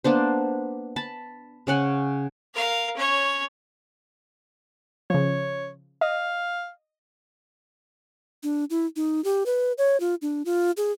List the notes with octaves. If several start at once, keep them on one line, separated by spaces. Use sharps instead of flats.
A#3 B3 D4 C5
A5 B5
C#3 C#4 F#5 G#5
A#4 F5
C#4 C#5
C#3 F3 C#5
D#5 F5
D4
E4
D#4
G4
B4
C#5
F4
D4
F4
G#4